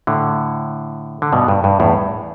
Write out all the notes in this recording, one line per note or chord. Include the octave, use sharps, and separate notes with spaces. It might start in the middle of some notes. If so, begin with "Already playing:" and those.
A2 D3
D3
G2 B2
G2
G2
E2 A2